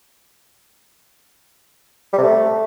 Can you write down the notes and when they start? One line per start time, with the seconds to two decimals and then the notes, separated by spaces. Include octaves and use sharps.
2.13 G3
2.18 C3
2.23 A3